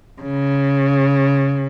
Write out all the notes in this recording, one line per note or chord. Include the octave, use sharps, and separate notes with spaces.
C#3